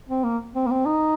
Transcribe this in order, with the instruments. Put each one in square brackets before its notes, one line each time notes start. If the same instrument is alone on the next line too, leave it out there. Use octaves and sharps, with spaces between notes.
[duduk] C4
A#3
C4
A#3
C4
D#4